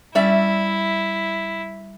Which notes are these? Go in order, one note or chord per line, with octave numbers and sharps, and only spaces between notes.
G3 C#4 E4 D5 E5